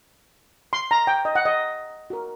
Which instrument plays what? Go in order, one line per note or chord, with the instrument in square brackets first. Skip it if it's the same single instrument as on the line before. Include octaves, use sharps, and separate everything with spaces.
[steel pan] C6
A#5
G5
D#5
F#5
D#5
F#4 A#4